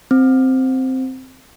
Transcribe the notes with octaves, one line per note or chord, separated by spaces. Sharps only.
C4